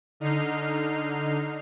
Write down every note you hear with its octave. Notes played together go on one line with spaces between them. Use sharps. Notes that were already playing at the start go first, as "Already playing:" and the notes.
D3 D#4 F6 C7